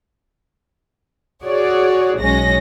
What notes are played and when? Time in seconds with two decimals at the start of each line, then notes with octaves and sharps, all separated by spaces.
1.43 F#4 G#4 C#5 D5
2.20 B1 G#3 C#4 A#6